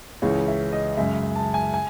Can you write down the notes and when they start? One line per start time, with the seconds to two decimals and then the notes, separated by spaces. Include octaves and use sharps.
0.22 C#2 C#3 E3 C#5
0.48 E5
0.73 D#5
0.97 F#2 C#3 G#3 E5
1.36 A5
1.54 G#5
1.74 G#5